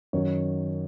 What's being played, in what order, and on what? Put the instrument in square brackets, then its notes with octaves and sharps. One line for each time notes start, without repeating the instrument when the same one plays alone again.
[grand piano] F#2 D#3 F#3 C#5